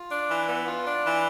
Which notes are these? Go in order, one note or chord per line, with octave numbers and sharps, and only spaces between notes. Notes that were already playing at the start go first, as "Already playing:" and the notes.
Already playing: F4
D4
E3
B3
F4
D4
E3